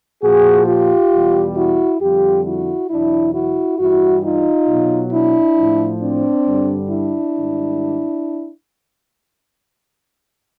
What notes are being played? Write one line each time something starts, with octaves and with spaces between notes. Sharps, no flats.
A#2 F3 F#4 G#4
F4 G4
E2 B2 G3
E4 F#4
F2 D3 G3 F4 G4
E4 F#4
E2 B2 F#3 D4 E4
E4 F#4
G2 E3 G3 E4 F#4
D#4 F4
B2 F#3
D4 E4
A2 F3
C4 D4
G2 D3 G3
D4 E4
G#2 D#3 G3